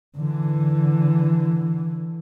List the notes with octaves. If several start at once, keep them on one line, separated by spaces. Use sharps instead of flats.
D3 E3